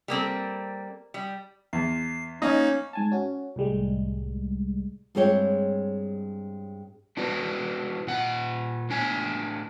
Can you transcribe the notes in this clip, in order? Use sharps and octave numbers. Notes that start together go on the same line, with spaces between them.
G3 A#3 C4 A4
G3
E2 C7
A#3 C#4 D#4 D#5
G#2 G#5 A5
C#4 F#4
C2 A2 G3 G#3
G2 G#3 C4 G#4 C#5 G5
D4 E4 F#4 B4
A#2 F#5
A2 D4 G#5